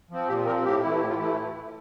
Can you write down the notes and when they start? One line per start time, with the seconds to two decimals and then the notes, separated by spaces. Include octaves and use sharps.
0.10 F3 C4
0.28 A#2 G4
0.46 F3 C4 A#4
0.64 A2 G4
0.82 E3 A3 E4
1.01 A2 G4
1.10 F4
1.18 E3 A3 E4 G4